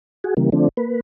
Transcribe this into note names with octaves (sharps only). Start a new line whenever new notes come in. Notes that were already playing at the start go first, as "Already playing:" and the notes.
F#4 G#4
C#3 E3 G3 A#3
D3 F3 A3 C4 D4
A#3 B4